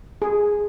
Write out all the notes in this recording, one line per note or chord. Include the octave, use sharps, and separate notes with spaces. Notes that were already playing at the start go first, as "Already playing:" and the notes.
G#4